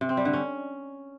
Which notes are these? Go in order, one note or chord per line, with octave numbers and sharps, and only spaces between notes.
C3
C4
G3
D3
C#4